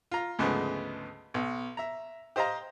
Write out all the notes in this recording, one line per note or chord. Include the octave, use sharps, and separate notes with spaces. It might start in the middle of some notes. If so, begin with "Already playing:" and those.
F4 A#5
D2 G#2 C#3 F3 B3
B1
E5 A#5
G4 C5 D#5 F5 A#5